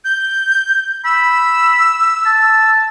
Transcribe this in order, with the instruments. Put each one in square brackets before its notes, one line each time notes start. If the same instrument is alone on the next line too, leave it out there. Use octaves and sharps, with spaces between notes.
[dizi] G6
[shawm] B5 [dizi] E6
[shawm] A5